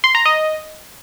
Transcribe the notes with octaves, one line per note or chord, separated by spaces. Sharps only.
C6
A#5
D#5